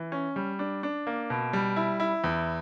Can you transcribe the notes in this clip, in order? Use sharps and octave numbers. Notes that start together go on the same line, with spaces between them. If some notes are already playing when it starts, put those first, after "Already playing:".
Already playing: E3
C#4
G3
D4
D4
A#3
B2
G3
E4
E4
E2